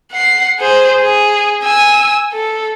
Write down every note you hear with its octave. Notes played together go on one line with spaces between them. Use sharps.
F#5 C7
G#4 C5
G#4
G#5 E6
A4